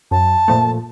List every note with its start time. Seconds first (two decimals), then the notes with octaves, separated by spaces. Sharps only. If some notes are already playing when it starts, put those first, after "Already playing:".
0.11 F#2 A5
0.48 A#2 F3 A3